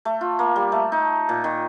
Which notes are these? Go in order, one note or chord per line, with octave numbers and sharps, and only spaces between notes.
A3
F4
A#3
G3
A3
D#4
A#2
D#3